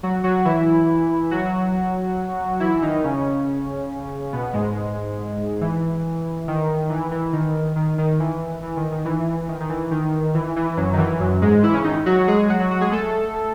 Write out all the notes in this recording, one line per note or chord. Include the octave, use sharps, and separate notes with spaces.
F#3 F#4
F#3 F#4
E3 E4
F#3 F#4
E3 E4
D#3 D#4
C#3 C#4
B2 B3
G#2 G#3
E3
D#3
E3
E3
D#3
D#3
D#3
E3
E3
D#3
D#3
E3
D#3
D#3
E3
D#3
E3
E3
F#2 F#3
D#3
E3
F#2 F#3
G#2 G#3
E3 E4
C#3 C#4
D#3 D#4
F#3 F#4
G#3 G#4
F#3 F#4
F#3 F#4
F#3 F#4
G#3 G#4
A3 A4